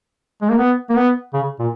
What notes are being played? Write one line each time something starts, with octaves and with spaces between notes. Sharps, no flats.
G#3
A#3
B3
A#3
B3
C#3
A#2